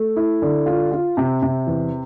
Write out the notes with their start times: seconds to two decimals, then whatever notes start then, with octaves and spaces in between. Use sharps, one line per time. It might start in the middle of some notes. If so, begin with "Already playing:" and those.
Already playing: A3
0.16 E4
0.42 D3
0.66 F4
0.92 F4
1.17 C3
1.42 C3
1.67 E2